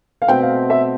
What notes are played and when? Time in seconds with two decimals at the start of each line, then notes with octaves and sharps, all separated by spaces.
0.22 F5
0.28 B2 A3 C4 G5
0.42 F5
0.70 E5